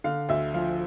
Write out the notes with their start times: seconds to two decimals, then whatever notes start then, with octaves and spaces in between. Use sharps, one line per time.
0.04 D3 F5
0.29 D2 E5
0.54 F3 F5